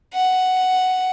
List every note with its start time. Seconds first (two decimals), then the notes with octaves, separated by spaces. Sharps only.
0.14 F#5